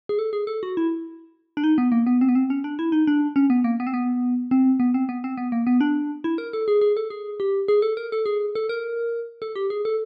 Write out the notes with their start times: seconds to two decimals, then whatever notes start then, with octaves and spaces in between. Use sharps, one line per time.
0.09 G#4
0.19 A4
0.33 G#4
0.47 A4
0.63 F#4
0.77 E4
1.57 D4
1.64 D#4
1.78 B3
1.92 A#3
2.07 B3
2.21 C4
2.29 B3
2.35 C4
2.50 C#4
2.64 D4
2.79 E4
2.92 D#4
3.07 D4
3.36 C#4
3.50 B3
3.64 A#3
3.80 B3
3.87 C4
3.94 B3
4.51 C4
4.80 B3
4.94 C4
5.09 B3
5.24 C4
5.37 B3
5.52 A#3
5.67 B3
5.81 D4
6.24 E4
6.38 A#4
6.53 A4
6.68 G#4
6.81 G#4
6.97 A4
7.10 G#4
7.40 G4
7.68 G#4
7.82 A4
7.97 A#4
8.12 A4
8.26 G#4
8.55 A4
8.69 A#4
9.42 A4
9.56 G4
9.70 G#4
9.85 A4